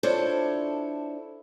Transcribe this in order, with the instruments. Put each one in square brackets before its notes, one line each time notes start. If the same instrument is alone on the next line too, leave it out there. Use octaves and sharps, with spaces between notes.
[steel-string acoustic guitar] D4 E4 F4 A4 C5 C#5